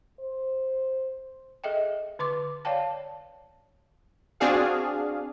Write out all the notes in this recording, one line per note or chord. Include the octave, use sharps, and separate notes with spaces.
C5
G#4 A4 D#5 E5 G5
D3 B4 C6 D6
C#5 D5 F5 G5 A5
C4 D4 F#4 G#4 F5